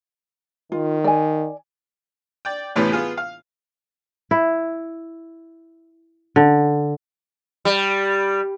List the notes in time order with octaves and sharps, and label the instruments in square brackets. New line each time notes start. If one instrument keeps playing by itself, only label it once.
[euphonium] D#3 [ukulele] F4
[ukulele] D5 G#5
[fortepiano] D5 G5
A1 A2 C3 E3 B3 C#4
B3 F4 G#4
F5
[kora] E4
D3
[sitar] G3